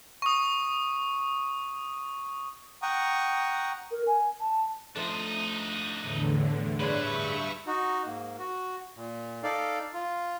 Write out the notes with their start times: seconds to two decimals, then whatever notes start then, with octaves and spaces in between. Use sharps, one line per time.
0.22 C#6 D#6
2.82 F#5 G5 A#5 C#6 D#6
3.91 A#4
4.07 G#5
4.40 A5
4.96 F3 A3 D4 D#4
5.99 E2 A2 D3
6.80 G2 G#3 D4 B4 C#5 E5 C#6
7.67 D#4 F#4
8.06 G#2 A#3
8.39 F#4
8.96 A#2
9.43 D#4 A4 D5 F5
9.94 F4